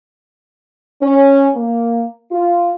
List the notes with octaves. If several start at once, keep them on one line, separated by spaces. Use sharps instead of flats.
C#4
A#3
F4